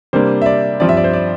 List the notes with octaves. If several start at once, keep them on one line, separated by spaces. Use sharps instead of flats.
C3 G3 A#3 D4 C5
E5
D5
G2 F3 C4 D5
E5
D5
C5
D5